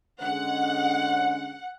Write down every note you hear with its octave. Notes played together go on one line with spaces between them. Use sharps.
D3 G#3 C#4 F#5